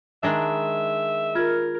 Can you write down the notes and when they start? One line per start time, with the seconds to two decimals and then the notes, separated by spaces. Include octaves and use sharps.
0.23 D#3 G#3 D4 E5
1.35 F4 A#4 F6 G#6